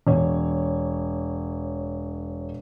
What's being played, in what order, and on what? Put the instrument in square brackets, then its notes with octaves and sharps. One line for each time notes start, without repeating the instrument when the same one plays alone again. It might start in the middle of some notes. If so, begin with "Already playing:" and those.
[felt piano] E1 C#5